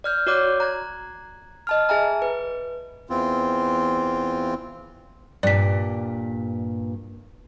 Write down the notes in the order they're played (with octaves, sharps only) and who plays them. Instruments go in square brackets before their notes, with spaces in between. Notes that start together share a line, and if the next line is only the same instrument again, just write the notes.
[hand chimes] D5 F6 G6
F#4 C#5 D5 D6 F#6 G6
A#5 F#6 G#6
D#5 A5 F6
G#4 E5 G#5 A#5
B4
[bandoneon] E2 E3 C4 F4
[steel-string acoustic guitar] G2 A#2 [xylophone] D5 B6